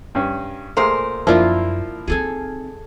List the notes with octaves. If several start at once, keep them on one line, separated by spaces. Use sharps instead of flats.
G2 C#4
A#2 A3 G#4 A#4 C5
F#2 F3 A#3 D4 E4 F4
C4 D#4 G#4 A4 G#5